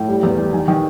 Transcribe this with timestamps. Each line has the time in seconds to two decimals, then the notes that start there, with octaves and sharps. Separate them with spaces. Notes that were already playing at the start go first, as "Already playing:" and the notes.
Already playing: A2
0.08 G3
0.23 E2
0.38 G3
0.53 D#3 G#5
0.68 D#3